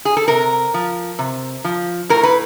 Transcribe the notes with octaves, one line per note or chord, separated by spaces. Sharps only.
G#4
A4
C3 A#4
F3
C3
F3
A2 A#4
B4